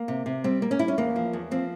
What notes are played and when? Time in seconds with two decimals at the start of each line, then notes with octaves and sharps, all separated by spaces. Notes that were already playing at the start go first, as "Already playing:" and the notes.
Already playing: A#3
0.08 C3
0.26 C3
0.44 G3 C4
0.62 A#3
0.71 C#4
0.79 G3 E4
0.88 C#4
0.98 E2 A#3
1.16 F3
1.33 E2
1.51 F3 C4